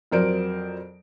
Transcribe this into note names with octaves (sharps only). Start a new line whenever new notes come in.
F2 F#3 A#4 C5 D5 D7